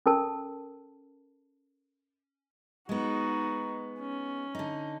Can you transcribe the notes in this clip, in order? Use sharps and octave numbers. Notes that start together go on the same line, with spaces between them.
C#4 A4 A#4 A5
G#3 B3 D#4 F#4
C#4
D3 D#4